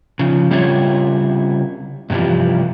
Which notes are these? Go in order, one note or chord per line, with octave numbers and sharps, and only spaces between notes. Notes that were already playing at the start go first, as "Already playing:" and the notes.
C#3 F3
C#3 G3 C4 E4 F4 C#5
G2 C3 E3 F3 G3